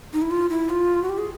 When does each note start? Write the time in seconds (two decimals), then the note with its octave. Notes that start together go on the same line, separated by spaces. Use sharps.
0.13 D#4
0.22 E4
0.31 F4
0.49 E4
0.69 F4
1.02 F#4
1.09 G4
1.18 G#4